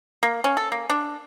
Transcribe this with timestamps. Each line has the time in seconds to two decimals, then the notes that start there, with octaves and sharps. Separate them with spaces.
0.23 A#3
0.44 C#4
0.57 A4
0.72 A#3
0.90 D4